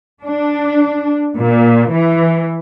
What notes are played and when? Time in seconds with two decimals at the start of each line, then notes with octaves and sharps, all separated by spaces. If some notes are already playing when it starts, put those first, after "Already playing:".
0.24 D4
1.35 A#2
1.93 E3